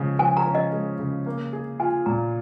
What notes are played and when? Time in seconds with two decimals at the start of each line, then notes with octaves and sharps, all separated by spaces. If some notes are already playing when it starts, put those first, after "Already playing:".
Already playing: C#3 F3 G#3 C#4
0.19 F3 G#5
0.37 A#5
0.45 C#4
0.55 D#5
0.73 G#3
0.99 C#3
1.26 A#3
1.53 G#4
1.80 F4 G#5
2.06 A#2 A#5